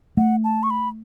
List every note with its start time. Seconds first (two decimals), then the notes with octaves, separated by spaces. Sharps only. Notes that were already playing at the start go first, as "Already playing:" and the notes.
0.17 A3 F#5
0.44 A5
0.63 C#6
0.70 B5